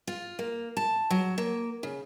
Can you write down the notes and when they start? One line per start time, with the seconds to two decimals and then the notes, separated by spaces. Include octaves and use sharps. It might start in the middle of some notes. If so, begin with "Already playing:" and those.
0.07 F4
0.39 A#3
0.77 A5
1.10 F#3
1.38 A#3
1.83 C#3